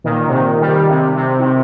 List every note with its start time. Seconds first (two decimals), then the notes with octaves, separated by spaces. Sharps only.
0.04 A#2 D#3
0.28 C3
0.33 A#2 D#3
0.61 D#3 G3
0.89 C3
1.16 C3
1.40 D#3
1.44 C3